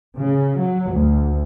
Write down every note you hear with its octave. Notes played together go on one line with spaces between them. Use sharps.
C#3
F#3
D2